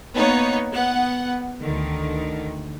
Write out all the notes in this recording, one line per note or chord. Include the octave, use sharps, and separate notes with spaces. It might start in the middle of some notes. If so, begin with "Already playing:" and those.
A#3 B3 D#4 C#5
B3 F#5
D2 D3 D#3